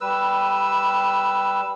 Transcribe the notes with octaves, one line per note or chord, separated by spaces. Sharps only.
G3 B4 E6